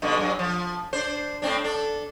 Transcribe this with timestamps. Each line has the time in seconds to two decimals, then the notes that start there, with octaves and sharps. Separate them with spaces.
0.02 G2 B2 D3
0.17 G2 F#3
0.39 F3
0.93 D4 C5
1.42 A2 C4 D4
1.64 D4 A4